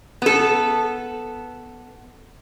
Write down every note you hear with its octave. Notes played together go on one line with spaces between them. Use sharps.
B3 A4